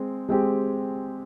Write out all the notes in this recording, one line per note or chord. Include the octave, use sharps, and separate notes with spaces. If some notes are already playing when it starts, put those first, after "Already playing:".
Already playing: G#3 C4
G#3 C4 G4